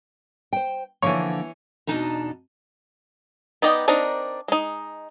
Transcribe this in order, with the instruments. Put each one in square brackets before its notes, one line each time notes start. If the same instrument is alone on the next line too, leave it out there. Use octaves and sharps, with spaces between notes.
[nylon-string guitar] C5 G5
[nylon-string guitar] D3 F3 A#3 [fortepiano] E3 C#5
[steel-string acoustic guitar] E2 B2 D4 D#4 A5 A#5
[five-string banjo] B3 D#4 D5 D#5 G5
C4 D4 D#4 A#4
G#3 D#4